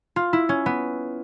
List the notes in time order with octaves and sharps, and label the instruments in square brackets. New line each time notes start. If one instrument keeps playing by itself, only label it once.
[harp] F4
E4
C#4
B3